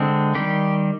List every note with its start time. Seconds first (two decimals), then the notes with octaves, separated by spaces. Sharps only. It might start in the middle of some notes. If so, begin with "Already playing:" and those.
Already playing: D3 G#3 C4
0.35 D#3 G3 G4